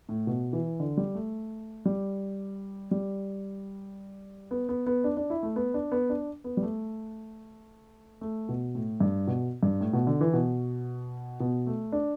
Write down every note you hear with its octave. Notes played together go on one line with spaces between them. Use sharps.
A2
B2
E3
D3
G3
A3
G3
G3
B3
B3
B3
D4
D4
E4
A3
B3
D4
B3
D4
B3
G3
A3
A3
B2
A2
G2
B2
G2
A2
B2
D3
E3
B2
B2
A3
D4